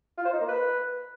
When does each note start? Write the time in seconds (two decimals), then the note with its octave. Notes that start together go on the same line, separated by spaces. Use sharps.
0.17 F4
0.25 C5
0.33 D#4
0.40 A#3
0.48 B4